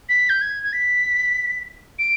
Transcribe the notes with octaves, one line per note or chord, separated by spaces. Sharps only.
B6
G6
G#6
G#6
B6
D7